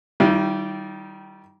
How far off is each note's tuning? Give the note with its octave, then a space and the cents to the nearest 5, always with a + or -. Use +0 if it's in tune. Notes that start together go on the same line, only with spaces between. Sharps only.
D#3 +0 G3 -20 E4 +40